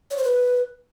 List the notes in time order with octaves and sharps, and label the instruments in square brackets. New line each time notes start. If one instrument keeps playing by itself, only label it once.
[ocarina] C#5
C5
B4